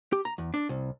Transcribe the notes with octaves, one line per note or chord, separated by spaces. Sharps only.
G4
A#5
E2
D4
C2